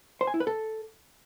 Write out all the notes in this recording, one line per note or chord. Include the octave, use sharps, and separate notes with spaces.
C5
G#5
E4
B4
A4